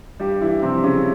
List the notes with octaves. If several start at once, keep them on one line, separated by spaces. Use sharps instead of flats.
G2 G3 G4
E3 E4
C3 F3 C4
C#3 C#4